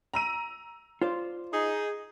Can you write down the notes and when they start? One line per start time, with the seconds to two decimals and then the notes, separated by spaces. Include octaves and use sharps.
0.14 A#5 E6 D#7
1.02 F4 C5 D5
1.53 D#4 G#4